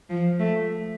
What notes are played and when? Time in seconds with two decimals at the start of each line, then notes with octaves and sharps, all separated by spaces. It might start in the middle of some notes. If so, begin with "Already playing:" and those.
0.10 F3
0.39 A3